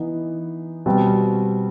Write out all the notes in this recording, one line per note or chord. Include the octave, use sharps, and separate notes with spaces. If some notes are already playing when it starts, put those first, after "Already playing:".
Already playing: E3 B3 D#4
B2 G3 C4